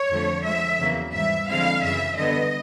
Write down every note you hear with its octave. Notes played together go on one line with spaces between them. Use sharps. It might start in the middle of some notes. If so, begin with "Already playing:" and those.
Already playing: C#5
F2 D3 F3 A3
D3 F3 G#3 E5
E2 C#3 F#3 A#3
G#2 E3 G3 E5
D3 F3 G#3 C4 E4 F5
F#2 C#3 E3 E5
D3 G3 B3 D#5